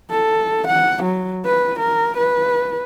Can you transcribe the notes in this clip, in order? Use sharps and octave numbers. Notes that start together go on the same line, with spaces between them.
A4
F#5
F#3
B4
A#4
B4